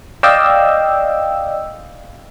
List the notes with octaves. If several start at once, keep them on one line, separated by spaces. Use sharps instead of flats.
D5 D#5 F5 G5 E6